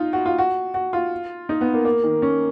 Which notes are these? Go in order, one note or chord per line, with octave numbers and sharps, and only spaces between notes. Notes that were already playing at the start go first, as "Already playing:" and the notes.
Already playing: D#4 F4
F#4
F4
F#4
F#4
F4
D#4
B3
A#3
A#3
D#3
C#4